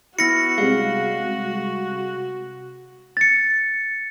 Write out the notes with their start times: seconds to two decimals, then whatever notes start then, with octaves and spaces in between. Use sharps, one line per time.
0.19 B3 E4 F#4 A#6 C#7
0.58 C3 G3 G#3 F5
3.17 A6 C#7